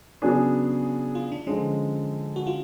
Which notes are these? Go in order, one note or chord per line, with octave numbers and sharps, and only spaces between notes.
C#3 F#3 B3 D4 G#4
F4
D4
D3 F3 G#3 C#4
F#4
F4